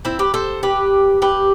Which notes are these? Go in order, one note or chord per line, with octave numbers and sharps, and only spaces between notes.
C4 E4
G4 B4
A4 C5
G4 B4
G4 B4